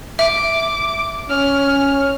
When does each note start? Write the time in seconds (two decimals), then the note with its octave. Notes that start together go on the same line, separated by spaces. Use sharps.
0.19 E5 D6
1.30 C#4 F6